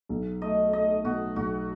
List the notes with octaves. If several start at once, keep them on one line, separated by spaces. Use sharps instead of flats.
B1
A3 D#5
A3 D#5
B2 F#4
B1 F#4